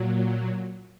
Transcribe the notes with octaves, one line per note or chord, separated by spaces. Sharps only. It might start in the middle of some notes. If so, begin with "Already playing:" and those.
Already playing: A#2 F#3